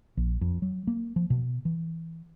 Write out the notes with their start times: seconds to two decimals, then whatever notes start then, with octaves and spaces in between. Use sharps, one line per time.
0.17 A#1
0.41 F2
0.62 F#3
0.87 A#3
1.16 F3
1.30 B2
1.65 E3